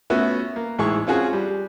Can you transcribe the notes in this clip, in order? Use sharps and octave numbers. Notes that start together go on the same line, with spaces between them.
A3 B3 C#4 F#4 E5
A#3
A1 G#2 E4 G#4 C#6
C4 C#4 F4 F#4 G#4
G3